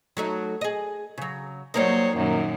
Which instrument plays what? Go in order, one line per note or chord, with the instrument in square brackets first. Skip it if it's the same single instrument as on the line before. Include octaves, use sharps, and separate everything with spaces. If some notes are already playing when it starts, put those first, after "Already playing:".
[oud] F#3 A3 D#4
G#4 D#5
C#3 F#3
[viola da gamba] F#3 C5 C#5 [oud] G3 A#3 D#4
[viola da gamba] F#2 A#2 D#3